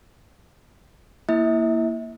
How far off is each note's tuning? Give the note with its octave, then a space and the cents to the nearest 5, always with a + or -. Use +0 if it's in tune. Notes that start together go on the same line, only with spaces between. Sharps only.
A#3 +0 E4 +0 E5 -35